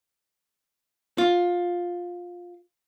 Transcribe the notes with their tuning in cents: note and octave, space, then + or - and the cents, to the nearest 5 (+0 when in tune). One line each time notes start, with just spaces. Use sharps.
F4 +15